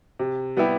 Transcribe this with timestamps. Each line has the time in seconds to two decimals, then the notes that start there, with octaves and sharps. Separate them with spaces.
0.19 C3
0.57 G3 B3 E4 G4